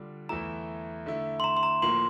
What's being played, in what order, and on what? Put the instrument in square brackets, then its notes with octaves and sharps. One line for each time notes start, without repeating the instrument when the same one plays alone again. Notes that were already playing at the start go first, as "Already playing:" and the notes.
Already playing: [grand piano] D3 G3 D4 F4
[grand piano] E2 E3 A3 E4 [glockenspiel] A#5
[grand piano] D3 A3 E4
[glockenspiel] C6
A#5
C6
A#5
[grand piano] A2 F3 A#3 [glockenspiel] C6